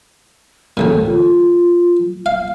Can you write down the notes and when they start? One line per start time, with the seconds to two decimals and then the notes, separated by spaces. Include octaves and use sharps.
0.77 A1 D2 A#2 A4
1.05 F4
2.26 F5